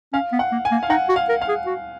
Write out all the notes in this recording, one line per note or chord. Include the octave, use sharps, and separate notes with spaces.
C#4 F5
B3
F#5
A#3
G#5
A#3
F5
D#4 F#5
F#4
F5
A#4
F5
G#4
F#4